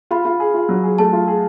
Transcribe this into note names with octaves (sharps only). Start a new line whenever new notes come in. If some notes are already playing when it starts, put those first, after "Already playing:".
F4 B5
F4
G#4
F4
F#3
G#4
A3 A5
F4
G#4